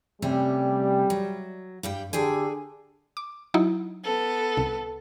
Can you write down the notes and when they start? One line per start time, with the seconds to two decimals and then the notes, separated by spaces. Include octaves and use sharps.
0.22 C3 G3 A3 C#4
1.10 F#3
1.83 G2 G3 G5
2.13 D3 G4 G#4 G5 G#5
3.17 D6
3.54 F#3 D#4 E4
4.04 B3 A4
4.57 C2